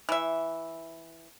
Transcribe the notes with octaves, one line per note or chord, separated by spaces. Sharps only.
E3 E5